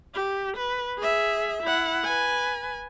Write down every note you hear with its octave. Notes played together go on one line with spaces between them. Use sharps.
G4
B4
G#4 E5
E4 F#5
B4 G#5